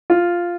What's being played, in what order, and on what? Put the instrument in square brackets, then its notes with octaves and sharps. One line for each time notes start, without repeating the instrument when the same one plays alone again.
[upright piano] F4